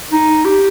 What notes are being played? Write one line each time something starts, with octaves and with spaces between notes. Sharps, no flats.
D#4
G4